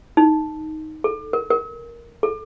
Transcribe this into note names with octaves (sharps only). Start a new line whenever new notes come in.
D#4
A4
A#4
A#4
A4